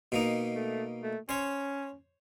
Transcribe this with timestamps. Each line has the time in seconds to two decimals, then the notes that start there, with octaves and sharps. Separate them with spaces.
0.12 B2 A#3 D#4
0.55 A3
1.03 A3
1.29 C#4 C5 C#5